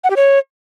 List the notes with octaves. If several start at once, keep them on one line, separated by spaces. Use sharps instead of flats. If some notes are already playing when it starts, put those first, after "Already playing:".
F#5
G4
C#5